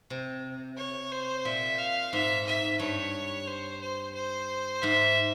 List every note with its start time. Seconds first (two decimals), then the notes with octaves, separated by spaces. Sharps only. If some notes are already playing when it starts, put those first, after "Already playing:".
0.10 C3
0.77 C#5
1.12 C5
1.45 A#2 E5
1.79 F5
2.12 G#2 E5
2.46 E5
2.80 G2 C#5
3.47 C5
3.81 C5
4.15 C5
4.82 G#2 E5